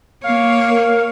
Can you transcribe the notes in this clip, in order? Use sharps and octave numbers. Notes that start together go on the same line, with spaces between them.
A#3 C#5 F5
A#4